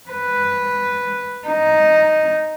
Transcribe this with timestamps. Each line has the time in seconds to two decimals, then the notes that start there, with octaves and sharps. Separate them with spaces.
0.10 B4
1.47 D#4